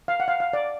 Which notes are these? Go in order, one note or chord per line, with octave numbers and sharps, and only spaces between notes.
F5
F#5
F5
F5
D5